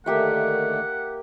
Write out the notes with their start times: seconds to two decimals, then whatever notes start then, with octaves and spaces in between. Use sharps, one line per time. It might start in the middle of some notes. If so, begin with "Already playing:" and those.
0.06 D3 D#3 A3 A#3 G4 E5 F#5